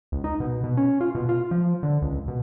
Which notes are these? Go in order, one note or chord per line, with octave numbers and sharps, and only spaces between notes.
C#2
D#4
B2
B2
C#4
F4
B2
F4
F3
D3
C#2
B2